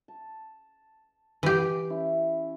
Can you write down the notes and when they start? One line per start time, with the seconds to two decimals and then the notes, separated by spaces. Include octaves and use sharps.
0.08 A5
1.43 E3 G4
1.90 C#4 E4